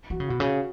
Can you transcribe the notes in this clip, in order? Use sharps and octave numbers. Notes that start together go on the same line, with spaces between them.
E3 F#4
C#3
B2 F#4
C#3